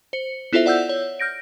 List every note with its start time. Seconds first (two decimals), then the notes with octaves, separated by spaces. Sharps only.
0.13 C5 C#7
0.53 B3 E4 F4 A4 C5 E5
0.66 D5 F#5 E6 G6
0.89 C#5
1.20 F6 G6 A#6 D7